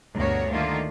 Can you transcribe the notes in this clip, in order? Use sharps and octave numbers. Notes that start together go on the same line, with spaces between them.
D2 G2 B2 F#4 A#4 C#5
D3 D#3 A3 A#3 F4